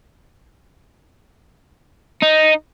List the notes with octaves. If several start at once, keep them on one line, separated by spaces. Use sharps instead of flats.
D#4